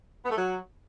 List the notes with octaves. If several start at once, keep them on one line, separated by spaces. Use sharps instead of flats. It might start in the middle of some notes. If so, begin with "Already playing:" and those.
B3
A3
F#3